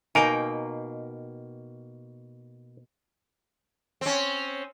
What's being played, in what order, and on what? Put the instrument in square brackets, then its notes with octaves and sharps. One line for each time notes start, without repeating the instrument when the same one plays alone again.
[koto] B2 A#3 G5 [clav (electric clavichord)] D#4 A#4 [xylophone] G#5
[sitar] C4 C#4